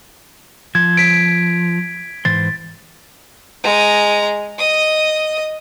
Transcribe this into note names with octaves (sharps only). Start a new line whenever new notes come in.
F3 G#6
B6 D7
G#2 E3 C5 A6
G#3 A#5
D#5 D#6